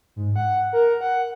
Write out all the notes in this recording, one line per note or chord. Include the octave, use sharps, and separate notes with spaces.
G#2
F#5
A#4
F#5